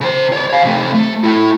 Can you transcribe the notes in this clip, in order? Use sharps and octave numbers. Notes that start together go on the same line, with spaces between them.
C#3 C5
C#5 D5
C#5 F5
C3 A3
A3
A3 E4